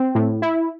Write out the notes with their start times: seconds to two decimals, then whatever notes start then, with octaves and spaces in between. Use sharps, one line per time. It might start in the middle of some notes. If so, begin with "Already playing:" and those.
Already playing: C4
0.15 A2
0.42 E4